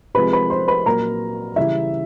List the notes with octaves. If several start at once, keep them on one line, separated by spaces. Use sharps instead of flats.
C3 F3 G#3 B4 B5
B4 B5
C5 C6
B4 B5
A#2 F#3 A#4 A#5
C#3 E3 G3 E4 E5